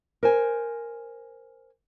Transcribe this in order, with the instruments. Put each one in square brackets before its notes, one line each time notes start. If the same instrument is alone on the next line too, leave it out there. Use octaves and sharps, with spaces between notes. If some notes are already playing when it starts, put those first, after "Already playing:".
[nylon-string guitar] A#4 C5 G#5